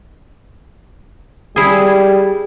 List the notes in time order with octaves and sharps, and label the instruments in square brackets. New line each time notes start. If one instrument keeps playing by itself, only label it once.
[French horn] G3 [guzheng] E4 G#4